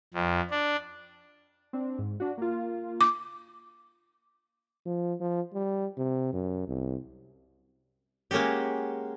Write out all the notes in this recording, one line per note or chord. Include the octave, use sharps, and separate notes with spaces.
F2
D4
C4 D4
G#2
D4 F#4
A#3 F4
D6
F3
F3
G3
C3
F#2
C2
G#3 A#3 C#4 F#4 G4